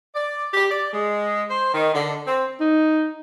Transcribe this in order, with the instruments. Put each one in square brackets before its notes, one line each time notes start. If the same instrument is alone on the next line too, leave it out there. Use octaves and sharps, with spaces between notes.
[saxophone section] D5
G4
D5
G#3
C5
D#3
D3
C4
[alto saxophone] D#4